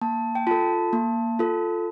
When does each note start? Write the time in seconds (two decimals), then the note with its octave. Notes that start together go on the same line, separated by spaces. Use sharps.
0.01 A#3 A5
0.35 G5
0.47 F4 A4 A5
0.93 A#3
1.39 F4 A4